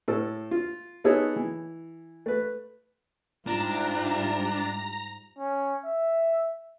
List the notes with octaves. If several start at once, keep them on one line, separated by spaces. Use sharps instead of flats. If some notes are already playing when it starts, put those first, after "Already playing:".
A2 A4
F4
B3 D#4 G#4 A4 B4 C#5
E3
A3 B4
G#2 G3 D4 E4 F4 A#5
C#4
E5